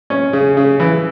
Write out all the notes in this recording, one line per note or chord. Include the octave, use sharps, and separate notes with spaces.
C#4
C#3
C#3
E3